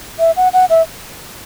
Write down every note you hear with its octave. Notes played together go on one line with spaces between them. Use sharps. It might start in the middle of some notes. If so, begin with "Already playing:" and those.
E5
F#5
F#5
E5